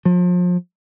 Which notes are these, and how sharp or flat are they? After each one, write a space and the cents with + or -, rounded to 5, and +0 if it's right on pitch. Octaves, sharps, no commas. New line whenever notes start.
F3 +35